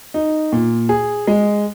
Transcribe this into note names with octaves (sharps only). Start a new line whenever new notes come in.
D#4
A#2
G#4
G#3